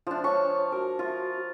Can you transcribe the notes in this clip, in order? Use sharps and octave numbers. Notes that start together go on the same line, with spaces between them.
F3 D4
C#5 F5 C#6
F#4 A#4
F4